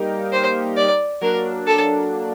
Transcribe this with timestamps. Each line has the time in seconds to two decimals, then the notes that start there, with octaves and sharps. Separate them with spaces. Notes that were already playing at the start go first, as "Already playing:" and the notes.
Already playing: G3 A#3 D#4 G4 A#4
0.32 C5
0.77 D5
1.21 F#3 A#3 D4 A#4
1.67 A4